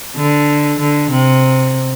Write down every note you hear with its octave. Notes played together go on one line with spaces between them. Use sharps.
D3
D3
C3